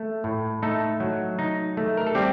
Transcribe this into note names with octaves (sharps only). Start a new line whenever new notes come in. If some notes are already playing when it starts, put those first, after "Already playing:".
Already playing: A3
A2
A3 D#4 A4
F#3
D#4
A3
A#4
A4
G3 C4 G4